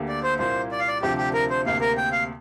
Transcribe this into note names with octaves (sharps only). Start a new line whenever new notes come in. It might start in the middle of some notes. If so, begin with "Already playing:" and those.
Already playing: D2 D3 A#3 G4
D5
C5
C2 A#2 A#3 C5
D5
F5
D5
D2 C3 F3 D4 G4
G4
A#4
C5
D2 C3 A#3 F5
A#4
G5
F5